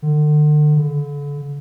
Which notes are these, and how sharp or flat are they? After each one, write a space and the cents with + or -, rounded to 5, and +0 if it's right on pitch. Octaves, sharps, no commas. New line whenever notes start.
D3 +40
D3 -35